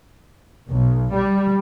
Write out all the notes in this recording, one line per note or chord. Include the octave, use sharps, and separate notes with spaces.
B1
G3